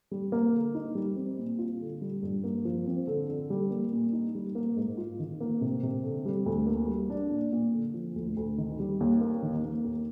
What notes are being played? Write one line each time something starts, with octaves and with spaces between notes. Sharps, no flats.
G3
A#3
D3
D#4
G3
C4
A#2
F4
D3
G3
G2
A#3
F3
C4
D3
D3
G3
A#3
A#2
D#4
G3
A#3
G#2
F4
D#3
A#3
C3
C3
D3
G3
D2
A#3
G3
D4
A#2
A#2
D3
F3
D2
D2
D#3
G3
D#2
A#3
D#3
A#3
D#2